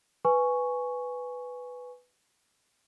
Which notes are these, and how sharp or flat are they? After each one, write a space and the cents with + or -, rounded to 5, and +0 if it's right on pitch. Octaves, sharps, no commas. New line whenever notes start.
B4 +5 G#5 +0 C#6 +0